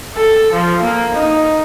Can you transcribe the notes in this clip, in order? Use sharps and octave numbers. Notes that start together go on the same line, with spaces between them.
A4
F3
A#3
D#4